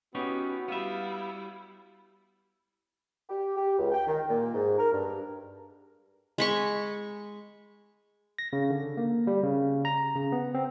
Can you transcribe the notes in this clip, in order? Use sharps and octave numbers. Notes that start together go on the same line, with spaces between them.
B3 C#4 D#4 E4 F#4 G4
G3 B3 E4 E5 F5
G4
G4
C#2
G5
D#3
A#2
G#2
A#4
G2
G#3 B5 C#6
A#6
C#3
D3
A#3
G3
C#3
A#5
C#3
B3
C4